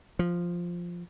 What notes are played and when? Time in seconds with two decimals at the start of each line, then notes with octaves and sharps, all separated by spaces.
0.19 F3